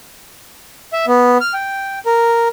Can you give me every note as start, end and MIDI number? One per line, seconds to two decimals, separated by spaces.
0.93 1.05 76
1.07 1.38 59
1.41 1.53 89
1.54 1.99 79
2.06 2.48 70